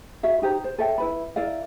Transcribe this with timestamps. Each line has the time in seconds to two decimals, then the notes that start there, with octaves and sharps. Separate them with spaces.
0.23 F#4 E5 F5
0.42 D#4 G4 C5 A#5
0.64 C5
0.78 A4 C#5 E5 G5
0.98 E4 B4 B5
1.36 E4 A#4 D5 F5